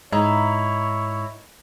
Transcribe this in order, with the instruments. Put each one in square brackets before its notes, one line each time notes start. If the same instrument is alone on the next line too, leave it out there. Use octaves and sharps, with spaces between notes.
[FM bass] G#2 [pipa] D#4 [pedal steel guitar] E4 A#5 [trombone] C#5